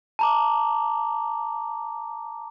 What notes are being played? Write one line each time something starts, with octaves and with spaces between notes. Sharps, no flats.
A5 A#5 D6